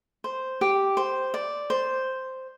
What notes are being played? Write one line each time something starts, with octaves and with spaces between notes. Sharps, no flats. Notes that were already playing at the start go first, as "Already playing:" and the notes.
C5
G4
C5
D5
C5